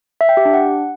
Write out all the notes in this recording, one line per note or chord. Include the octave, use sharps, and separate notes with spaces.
E5
G5
G4
D4
F#5